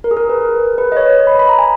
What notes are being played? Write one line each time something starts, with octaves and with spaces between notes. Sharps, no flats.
A#4
G#4
A#4
B4
B4
D#5
C#5
D#5
B5
B5
A#5
G#5